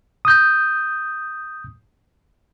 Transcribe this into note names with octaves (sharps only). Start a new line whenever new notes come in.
D#6 G6